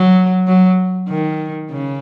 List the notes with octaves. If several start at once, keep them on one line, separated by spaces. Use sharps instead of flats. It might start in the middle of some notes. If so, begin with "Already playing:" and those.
Already playing: F#3
F#3
D#3
C#3